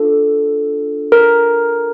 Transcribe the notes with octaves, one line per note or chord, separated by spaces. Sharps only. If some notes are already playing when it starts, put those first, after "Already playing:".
Already playing: D4 F4 A4
A#4